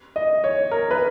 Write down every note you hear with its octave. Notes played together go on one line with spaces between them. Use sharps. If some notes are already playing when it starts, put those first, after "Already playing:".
D#5
C#5
A#4
B4